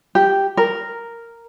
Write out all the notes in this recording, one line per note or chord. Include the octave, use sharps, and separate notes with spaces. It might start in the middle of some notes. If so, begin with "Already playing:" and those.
G4
A#4